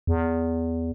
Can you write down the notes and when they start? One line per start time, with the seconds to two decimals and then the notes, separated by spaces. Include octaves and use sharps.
0.07 E2